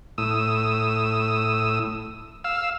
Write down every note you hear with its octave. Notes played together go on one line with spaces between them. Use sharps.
A2 D#6 E6
F5 E6